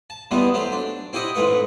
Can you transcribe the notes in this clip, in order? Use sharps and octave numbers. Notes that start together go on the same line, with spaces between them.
A5
E2 E3 G3 G#3 B3
F#3 A3 C5
D4
C4 E4 G4 D#5 F#5
A1 G#2 A3 B4 F#5